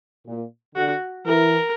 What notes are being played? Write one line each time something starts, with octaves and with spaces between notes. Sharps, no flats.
A#2
D3 F#4
E3 A#4